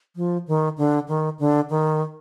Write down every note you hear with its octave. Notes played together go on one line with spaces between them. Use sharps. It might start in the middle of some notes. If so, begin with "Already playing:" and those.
F3
D#3
D3
D#3
D3
D#3